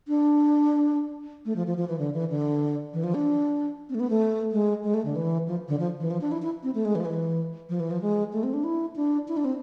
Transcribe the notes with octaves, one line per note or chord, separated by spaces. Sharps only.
D4
A3
F3
F3
F3
E3
D3
E3
D3
E3
F3
D4
C4
A3
B3
A3
G#3
G#3
A3
D3
E3
F3
D3
F3
E3
F3
D4
E4
E4
C4
A3
G#3
E3
F3
E3
F3
E3
F3
G#3
A3
C4
D4
E4
D4
E4
D4
C4